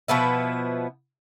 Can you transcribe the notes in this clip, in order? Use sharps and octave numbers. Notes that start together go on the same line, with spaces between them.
B2 F3 B3 E4